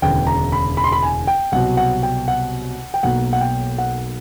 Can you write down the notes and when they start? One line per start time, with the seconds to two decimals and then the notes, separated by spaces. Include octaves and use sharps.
0.02 E1 D2 C#3 E3 G5
0.27 A#5
0.52 B5
0.77 B5
0.84 C6
0.92 B5
1.03 G#5
1.27 G5
1.52 C2 B2 F#3 F#5
1.77 F#5
2.03 G5
2.28 F#5
2.94 G5
3.03 B1 B2 F#3 A#3 F#5
3.33 F#5
3.41 G5
3.78 F#5